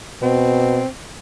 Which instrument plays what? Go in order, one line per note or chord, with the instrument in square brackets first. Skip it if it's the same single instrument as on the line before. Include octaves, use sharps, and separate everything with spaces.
[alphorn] B2 [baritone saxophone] C4